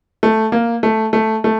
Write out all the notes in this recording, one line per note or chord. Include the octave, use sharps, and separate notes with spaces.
A3
A#3
A3
A3
A3